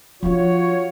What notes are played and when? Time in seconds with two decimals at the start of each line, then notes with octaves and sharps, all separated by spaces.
0.23 F3 D4 F4 F#4 C#5